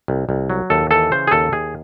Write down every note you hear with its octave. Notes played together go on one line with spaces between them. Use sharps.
C2
C2
F#3
D#2 A4
E3 A4
C#3 C5
G#4
D#2 A4
D#2 G#4